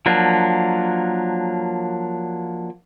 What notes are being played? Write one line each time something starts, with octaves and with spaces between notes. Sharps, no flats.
F3 F#3 A#3 D4